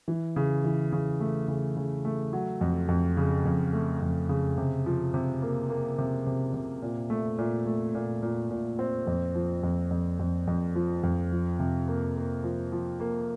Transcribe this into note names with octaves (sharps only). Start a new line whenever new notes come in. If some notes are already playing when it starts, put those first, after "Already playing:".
E3
C#3
E3
C#3
A3
C#3
C#3
A3
F#3
F2
F2
C#3
F2
A3
F2
C#3
C3
F3
C3
A#3
A#3
C3
C3
C3
A#2
A3
A#2
A3
A#2
A#2
A#2
C4
F2
F3
F2
F2
F2
F2
F3
F2
F3
C3
A#3
A#3
F3
F3
A#3